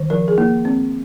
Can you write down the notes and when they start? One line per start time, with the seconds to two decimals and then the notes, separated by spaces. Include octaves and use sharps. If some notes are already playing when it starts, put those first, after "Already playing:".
Already playing: D#3
0.10 F3 A#4
0.28 G#4
0.38 A#3
0.65 C4